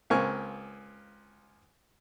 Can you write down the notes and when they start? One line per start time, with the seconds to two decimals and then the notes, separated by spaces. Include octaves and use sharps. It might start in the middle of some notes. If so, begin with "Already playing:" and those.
0.10 C#2 A#3 C4 G#5 C#6 F6